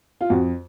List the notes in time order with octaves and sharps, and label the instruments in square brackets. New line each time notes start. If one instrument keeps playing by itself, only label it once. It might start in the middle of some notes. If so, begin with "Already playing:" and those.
[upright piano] F4
F2 F#4